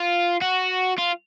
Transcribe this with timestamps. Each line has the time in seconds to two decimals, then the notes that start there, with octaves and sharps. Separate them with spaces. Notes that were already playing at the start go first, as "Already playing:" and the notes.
Already playing: F4
0.42 F#4
0.98 F4